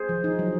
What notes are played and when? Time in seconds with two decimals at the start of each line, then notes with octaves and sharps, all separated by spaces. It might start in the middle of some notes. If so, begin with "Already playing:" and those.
Already playing: G#4 C5
0.09 F3
0.24 D#4
0.39 F#3